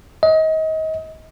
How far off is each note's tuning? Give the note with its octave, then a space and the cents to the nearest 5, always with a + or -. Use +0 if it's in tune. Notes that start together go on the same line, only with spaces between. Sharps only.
D#5 +30